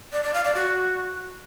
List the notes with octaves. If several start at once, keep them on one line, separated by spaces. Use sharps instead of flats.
D5
D5
F5
D5
F#4